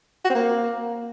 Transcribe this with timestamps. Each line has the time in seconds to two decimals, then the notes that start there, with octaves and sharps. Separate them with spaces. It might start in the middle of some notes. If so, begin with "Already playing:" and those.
0.25 F#4
0.30 C4
0.35 A#3